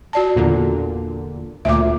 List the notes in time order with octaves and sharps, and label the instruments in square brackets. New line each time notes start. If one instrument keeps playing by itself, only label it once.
[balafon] F#4 D5 A5
[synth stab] E2 A#2 D3
[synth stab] D2 A#2 [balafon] E5 D6